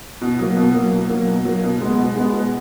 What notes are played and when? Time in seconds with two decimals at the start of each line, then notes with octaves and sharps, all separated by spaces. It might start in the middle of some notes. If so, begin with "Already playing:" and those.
0.21 B2
0.39 F#3 A#3
0.57 B2
0.74 F#3 A#3
0.92 B2
1.09 F#3 A#3
1.27 B2
1.45 F#3 A#3
1.63 B2
1.81 G#3 B3
1.98 B2
2.16 G#3 B3
2.33 B2